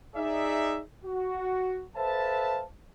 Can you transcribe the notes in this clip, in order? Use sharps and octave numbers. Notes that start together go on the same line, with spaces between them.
D#4 G#4 D5 E5
F#4
A4 B4 C5 E5 F5 A5